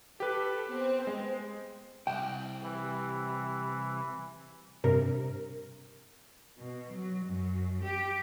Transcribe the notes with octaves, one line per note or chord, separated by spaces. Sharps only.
G4 A4 B4
B3 C4
G#3
C2 G5
E3 G4
G2 C3 A#4
B2
F#3
F#2
G4